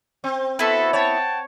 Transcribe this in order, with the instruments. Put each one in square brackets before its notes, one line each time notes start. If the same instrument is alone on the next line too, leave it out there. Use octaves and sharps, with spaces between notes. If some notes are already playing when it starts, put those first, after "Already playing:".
[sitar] C4
[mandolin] B3 E4 [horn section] F#4 A4
[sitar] C#5 [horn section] F#5 G5 A5